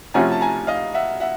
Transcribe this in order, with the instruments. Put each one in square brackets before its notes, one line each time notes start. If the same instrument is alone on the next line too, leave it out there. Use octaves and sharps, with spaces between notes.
[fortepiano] C3 F3 A3 C#4 F#4 [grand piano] G#5 A#5
[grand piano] A5
G#5 A#5
D#5 F5
E5 F#5
E5 F#5